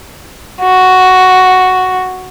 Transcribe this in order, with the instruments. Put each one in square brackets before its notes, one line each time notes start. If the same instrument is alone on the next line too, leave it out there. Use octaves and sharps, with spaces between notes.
[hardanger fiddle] F#4